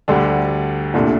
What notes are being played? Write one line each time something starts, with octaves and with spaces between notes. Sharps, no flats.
D2 D3 G3 D4 G4
C2 A#2 A3 D4